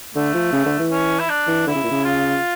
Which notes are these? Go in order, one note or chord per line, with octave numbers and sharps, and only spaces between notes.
D3 A3
F3
C#3
D3
E3
C#4
E4
D4
E3
D3 E4
C#3
A#2
C#3
F4